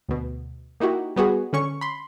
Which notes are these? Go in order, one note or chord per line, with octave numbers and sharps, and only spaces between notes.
D2 B2
A#3 D#4 E4 F#4 G4
G3 B3 F#4 G#4
D3 C#4 C#6
B5 C6